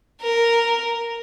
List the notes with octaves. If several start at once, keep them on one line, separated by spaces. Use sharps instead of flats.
A#4